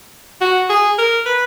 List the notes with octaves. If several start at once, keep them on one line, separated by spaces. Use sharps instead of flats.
F#4
G#4
A#4
B4